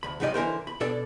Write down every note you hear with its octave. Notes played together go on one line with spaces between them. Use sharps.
D2 B5
D#2 G#2 G3 D#4 D5 D#5
D3 E3 A#4 C5
B5
B2 D4 A4 D5